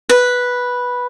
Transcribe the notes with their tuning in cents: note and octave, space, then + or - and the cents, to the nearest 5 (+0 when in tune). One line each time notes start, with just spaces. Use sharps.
B4 -5